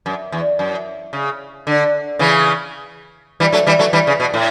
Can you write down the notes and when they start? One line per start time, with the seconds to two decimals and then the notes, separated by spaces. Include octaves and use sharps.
0.06 F#2
0.32 E2
0.59 F#2
1.13 C#3
1.67 D3
2.19 C#3 E3
3.40 E3 G3
3.53 F#3 A3
3.67 E3 G3
3.79 F#3 A3
3.93 E3 G3
4.07 C#3
4.20 B2
4.34 A2